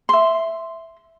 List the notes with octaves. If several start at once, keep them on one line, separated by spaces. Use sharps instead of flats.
E5 C6